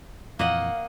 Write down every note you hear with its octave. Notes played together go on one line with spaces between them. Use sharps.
F2 A#2 E3 A#3 D#5 F5 F#5